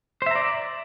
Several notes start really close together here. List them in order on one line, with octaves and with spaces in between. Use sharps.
C5 E5 A#5 D5